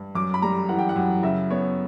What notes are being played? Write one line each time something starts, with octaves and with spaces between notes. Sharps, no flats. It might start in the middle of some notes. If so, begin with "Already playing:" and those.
Already playing: G2
F#2 D6
B5
G3 A#5
E3 F#5
G5
F#5
F#2
C#3 E5
B3 C#5